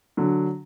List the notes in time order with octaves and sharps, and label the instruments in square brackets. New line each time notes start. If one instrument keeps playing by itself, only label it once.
[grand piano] D3 F#3